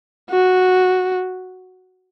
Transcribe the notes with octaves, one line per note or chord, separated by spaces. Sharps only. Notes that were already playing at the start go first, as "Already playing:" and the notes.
F#4